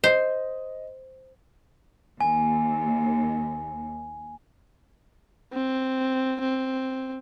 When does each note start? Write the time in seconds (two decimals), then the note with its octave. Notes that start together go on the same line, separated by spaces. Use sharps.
0.04 C5 D#5
2.21 D#2 G#5
5.53 C4
6.41 C4